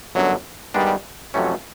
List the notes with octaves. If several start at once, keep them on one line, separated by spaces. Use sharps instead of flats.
G1 F#2 D3 F#3
G2 D#3 G3 G#3 B3 D4
F2 C3 E3 F#3 A3 C#4